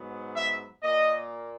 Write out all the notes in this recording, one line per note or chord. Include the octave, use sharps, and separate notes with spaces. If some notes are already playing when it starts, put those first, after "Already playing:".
Already playing: G#2 F#3 B3
E5
A#2 A#3 D#5